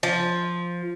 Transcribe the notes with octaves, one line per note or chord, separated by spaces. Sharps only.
F3